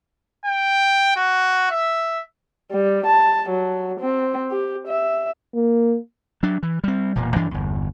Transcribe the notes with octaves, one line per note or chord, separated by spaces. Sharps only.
G5
F#4
E5
G3
A5
F#3
C4
G4
E5
A#3
F#3 D4
E3
G3 C4
E1 A#2 A#3
G2 E3 D4
G1 E2